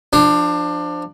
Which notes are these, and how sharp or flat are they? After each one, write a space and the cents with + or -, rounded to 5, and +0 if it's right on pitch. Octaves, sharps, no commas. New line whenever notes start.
F3 +0 D4 +20